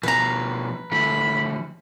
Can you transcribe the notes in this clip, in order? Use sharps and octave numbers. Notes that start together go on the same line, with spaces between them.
B2 F3 B4 A#5
D3 F3 A3 B5